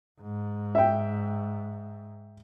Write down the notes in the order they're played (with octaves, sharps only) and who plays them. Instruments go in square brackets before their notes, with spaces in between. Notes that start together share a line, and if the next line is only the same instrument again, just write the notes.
[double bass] G#2
[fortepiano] E5 G5